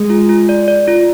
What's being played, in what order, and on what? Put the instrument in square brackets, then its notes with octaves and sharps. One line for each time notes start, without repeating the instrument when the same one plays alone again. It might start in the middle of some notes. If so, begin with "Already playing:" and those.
Already playing: [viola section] G#3
[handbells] F4
F4
D5
D5
F4